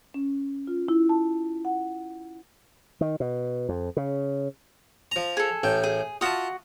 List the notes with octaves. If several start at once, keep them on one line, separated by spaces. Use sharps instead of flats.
C#4
F4
E4
A5
F#5
D#3
B2
F2
C#3
F3 A#5
G#4 A4
A1 A2 G5
G#4
F4 F#4 E5 A5 D#6